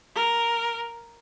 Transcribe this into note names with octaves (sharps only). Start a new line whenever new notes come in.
A#4